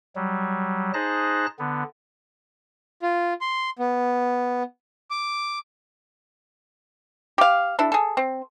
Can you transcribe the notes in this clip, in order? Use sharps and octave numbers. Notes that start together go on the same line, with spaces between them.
F#3 G3
D#4 G#4 C5 A5 F#6 A#6
D3 B3
F4
C6
B3
D6
G4 F5
D4 E4 A4
G#4 A4
C4